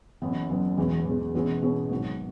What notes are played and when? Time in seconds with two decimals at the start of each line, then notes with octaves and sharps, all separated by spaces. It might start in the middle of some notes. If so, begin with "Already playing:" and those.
0.22 F#1 F#2 E3 B3
0.49 F#1 F#2 E3 B3
0.77 E1 E2 E3 G#3
1.06 E1 E2 E3 G#3
1.35 E2 B2 G#3 C#4 E4
1.62 E2 B2 G#3 C#4 E4
1.91 G#1 G#2 F#3